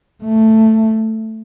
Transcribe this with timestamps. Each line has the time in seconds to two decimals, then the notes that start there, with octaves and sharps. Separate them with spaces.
0.24 A3